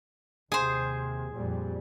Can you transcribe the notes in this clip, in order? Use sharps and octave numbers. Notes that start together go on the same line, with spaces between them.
D#2 C3 G#4 C5
F2 A#2 G3